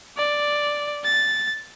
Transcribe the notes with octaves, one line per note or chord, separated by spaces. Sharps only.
D5
A6